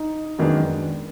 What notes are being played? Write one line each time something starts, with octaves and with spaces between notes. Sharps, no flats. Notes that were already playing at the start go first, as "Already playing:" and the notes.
Already playing: D#4
F#2 D#3 G#3 B3 D4